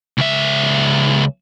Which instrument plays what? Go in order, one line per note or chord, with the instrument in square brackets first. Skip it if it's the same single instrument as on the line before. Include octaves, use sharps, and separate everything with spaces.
[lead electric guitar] C#2 E5